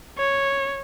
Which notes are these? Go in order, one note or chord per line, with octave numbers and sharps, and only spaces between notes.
C#5